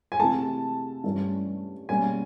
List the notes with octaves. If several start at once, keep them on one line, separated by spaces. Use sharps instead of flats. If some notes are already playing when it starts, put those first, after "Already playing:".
G#5
C3 E3 A3 A5
G2 E3 A3 C#4
B2 G3 A#3 C#4 G#5